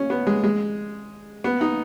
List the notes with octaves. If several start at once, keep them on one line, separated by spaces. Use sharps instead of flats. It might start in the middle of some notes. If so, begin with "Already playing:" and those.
Already playing: C#4
B3
G#3
G#3
B3
D#4